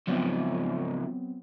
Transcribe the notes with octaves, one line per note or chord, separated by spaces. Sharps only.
C#2 F3 F#3 B3 C4